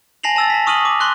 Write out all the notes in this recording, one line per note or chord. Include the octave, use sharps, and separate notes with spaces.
G#5 A5 A#6 C7 F7 F#7
A5 E6 A6
A5 B6
C#6 D#6 F6 D#7 F#7
D6
C6 C#6 F#6